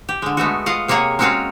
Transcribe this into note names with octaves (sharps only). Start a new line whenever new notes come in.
G4
D3 G#3
G#3 A3 B3 F#4
F4 D#5 F5 F#5
C3 A#3 G#4 C#5 F#5
G#3 C4 C#4 F#4 C#5 F5